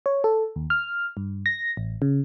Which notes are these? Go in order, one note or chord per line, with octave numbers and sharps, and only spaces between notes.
C#5
A4
D#2
F6
G2
A#6
A1
C#3